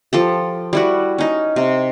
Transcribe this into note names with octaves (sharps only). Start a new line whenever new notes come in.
F3 G4 A4
G3 E4 F#4
C#4 D#4
C3